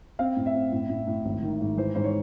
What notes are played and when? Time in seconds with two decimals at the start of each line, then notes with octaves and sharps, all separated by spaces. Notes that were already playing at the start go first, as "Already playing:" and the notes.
0.19 C4 F5
0.37 A2
0.46 E5
0.55 C4
0.72 A2
0.89 A2
1.07 A2
1.25 G#1
1.43 D#3
1.61 G#2
1.77 E3 C5
1.95 G#2 C5
2.04 C#5